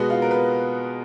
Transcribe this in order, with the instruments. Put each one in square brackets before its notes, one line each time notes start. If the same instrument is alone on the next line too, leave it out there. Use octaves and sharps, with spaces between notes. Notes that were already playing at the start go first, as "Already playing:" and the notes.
Already playing: [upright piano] B2 G#3 B3 F#4
F4
A#4
B4